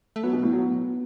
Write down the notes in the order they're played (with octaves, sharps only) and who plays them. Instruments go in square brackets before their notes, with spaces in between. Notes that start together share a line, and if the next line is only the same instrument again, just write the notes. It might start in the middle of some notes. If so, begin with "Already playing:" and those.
[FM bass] A3
[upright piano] F#3 [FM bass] B3
[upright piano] B2
A2
F#3